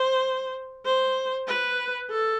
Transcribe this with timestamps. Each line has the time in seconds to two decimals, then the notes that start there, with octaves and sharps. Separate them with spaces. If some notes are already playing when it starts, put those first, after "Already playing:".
Already playing: C5
0.85 C5
1.47 B4
2.10 A4